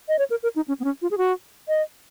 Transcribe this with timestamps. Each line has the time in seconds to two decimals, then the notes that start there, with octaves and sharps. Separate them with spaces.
0.08 D#5
0.19 C#5
0.30 A#4
0.43 A#4
0.56 D#4
0.68 C#4
0.80 B3
0.84 C#4
1.02 F4
1.11 G#4
1.18 F#4
1.68 D#5